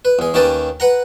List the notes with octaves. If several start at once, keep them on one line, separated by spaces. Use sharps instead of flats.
B4
E2 G#4
D#2 D#3 C#4 G4 B4 A5
B4 F#5 A#5